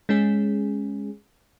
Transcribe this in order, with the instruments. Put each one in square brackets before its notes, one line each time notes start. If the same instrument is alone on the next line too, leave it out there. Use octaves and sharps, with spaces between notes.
[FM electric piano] G#3 C#4 G#4